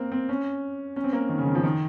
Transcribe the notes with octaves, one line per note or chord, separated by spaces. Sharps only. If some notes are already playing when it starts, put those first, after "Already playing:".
Already playing: A#3 C4
C4
C#4
C#4
C4
A#3
D#3
C#3
D#3
F3
D#3